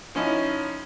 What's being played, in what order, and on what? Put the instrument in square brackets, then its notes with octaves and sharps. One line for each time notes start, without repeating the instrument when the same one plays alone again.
[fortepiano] F3 C#4 D#4 E4